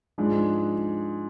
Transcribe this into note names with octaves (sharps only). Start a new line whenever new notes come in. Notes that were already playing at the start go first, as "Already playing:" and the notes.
G#2 F3 G#3 D4